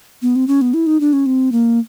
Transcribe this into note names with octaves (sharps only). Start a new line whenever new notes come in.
B3
C4
C#4
B3
E4
D#4
D4
C#4
C4
A#3